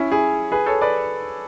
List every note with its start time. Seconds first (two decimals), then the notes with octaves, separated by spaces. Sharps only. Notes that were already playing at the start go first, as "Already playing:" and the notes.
Already playing: C#4 E4
0.12 E4 G#4
0.52 G#4 B4
0.66 A4 C#5
0.82 B4 D5